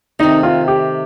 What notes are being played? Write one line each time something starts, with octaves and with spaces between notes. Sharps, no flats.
C3 D#3 A3 C4 D#4
F4
G4